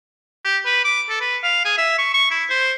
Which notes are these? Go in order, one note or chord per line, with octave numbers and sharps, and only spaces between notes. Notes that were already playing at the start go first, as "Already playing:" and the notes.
G4
B4
D6
A4
B4
F5
G#4
E5
C#6
C#6
E4
C5